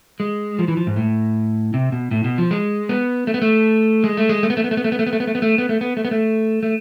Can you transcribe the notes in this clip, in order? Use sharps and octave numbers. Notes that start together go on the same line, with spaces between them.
G#3
F3
E3
F3
G#2
A2
C3
B2
A2
B2
F3
G#3
B3
A3
B3
A3
G#3
A3
G#3
A3
B3
A3
B3
A3
B3
A3
B3
A3
B3
A3
B3
A3
B3
A3
B3
A3
B3
A3
B3
A3
A3